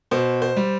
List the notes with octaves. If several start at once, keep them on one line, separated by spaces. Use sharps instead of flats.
B2 C5
C5
G3